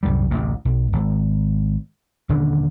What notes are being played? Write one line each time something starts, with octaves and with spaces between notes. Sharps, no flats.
C2 F#2 A2 G3
A1 D2 C3
B1
G#1
D#1 D3 C#4 D4